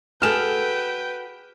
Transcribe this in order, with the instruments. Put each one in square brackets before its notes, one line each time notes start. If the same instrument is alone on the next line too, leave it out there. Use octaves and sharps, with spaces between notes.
[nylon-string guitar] F#4 G#4 A4 [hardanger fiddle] B4 [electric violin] G5 [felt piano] F6 E7